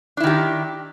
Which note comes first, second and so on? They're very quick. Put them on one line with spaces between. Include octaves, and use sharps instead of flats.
D4 E4 D#3 G4